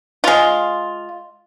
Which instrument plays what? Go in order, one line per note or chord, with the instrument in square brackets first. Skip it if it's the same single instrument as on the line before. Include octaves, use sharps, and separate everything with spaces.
[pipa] G#3 F4